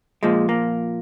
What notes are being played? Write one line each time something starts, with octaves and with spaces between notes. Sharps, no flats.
A#2 F3 G#3
A#3